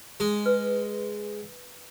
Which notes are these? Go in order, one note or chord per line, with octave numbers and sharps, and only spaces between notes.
G#3
B4